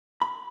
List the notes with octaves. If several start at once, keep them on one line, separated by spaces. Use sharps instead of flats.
B5